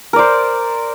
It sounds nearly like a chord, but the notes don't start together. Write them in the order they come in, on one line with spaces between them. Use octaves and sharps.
A#4 D5 C5